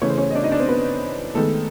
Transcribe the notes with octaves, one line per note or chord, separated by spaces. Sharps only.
C#3 E3 A3 C#5
C5
C#4 C#5
D#5
D4 D5
D#4 D#5
D4 D5
C4 C5
B3 B4
D#3 G#3 A3 B3 A4